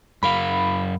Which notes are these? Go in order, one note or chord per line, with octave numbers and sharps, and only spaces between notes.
F#2 A#4 F5 B5